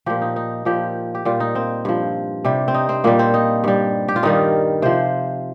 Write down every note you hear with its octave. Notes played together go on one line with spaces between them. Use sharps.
A#2 F3 G4
D#4
D#4
A#2 F3 G4
G4
A#2 G3 F4
D#4
C4
G2 F3
C3 G3
C4
D#4
C4
A#2 G3 A#3
C4
D#4
G2 G3
G4
F4
G2 D#3 G3 D#4
C3 F3 C5